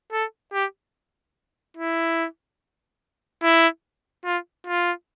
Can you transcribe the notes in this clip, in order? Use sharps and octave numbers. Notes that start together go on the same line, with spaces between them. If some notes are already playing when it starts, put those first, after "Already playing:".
A4
G4
E4
E4
F4
F4